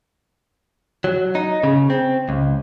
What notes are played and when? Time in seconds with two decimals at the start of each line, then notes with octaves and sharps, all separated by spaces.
1.04 F#3
1.35 D#4
1.63 C#3
1.90 C4
2.29 C#2